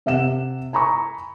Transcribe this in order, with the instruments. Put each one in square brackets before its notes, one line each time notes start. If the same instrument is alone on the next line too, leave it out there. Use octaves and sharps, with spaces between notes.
[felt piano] C3 E5 F#5 E7
G#5 A#5 B5 C#6